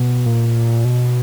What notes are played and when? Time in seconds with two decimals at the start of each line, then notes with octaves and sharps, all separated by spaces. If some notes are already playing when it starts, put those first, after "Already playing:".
Already playing: B2
0.26 A#2
0.85 B2